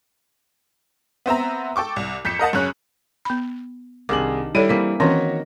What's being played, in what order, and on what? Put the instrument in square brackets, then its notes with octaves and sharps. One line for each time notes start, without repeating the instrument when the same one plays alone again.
[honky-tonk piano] B3 C4 E5 A#5
A4 G5 C#6 D6
C2
F2 G6 B6 C#7 E7
A#4 D#5 F#5 A5
F#2 C#3 C#4 F#6
[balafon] B3 B5
[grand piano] C2 G#4 F#7 [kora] D#3 D4 [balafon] D6
[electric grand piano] G3 E4 D#7 [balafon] A4 C#5 D5 [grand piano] D7
[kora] E3 A#3 C4 [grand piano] B6
[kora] D#3 [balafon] E3 C4 C#4 [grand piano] F#4 C#5 A#6 [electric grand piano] A#5